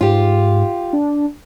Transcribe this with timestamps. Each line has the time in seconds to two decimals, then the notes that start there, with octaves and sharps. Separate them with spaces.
0.01 G#2 F4 G4
0.93 D4